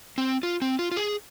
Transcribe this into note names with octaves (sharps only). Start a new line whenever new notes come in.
C4
F4
C4
F4
F4
G#4